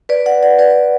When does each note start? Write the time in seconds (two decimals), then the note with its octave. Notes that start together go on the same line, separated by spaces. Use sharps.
0.09 B4 D5
0.26 D5 F#5
0.43 D5 F#5
0.59 B4 D5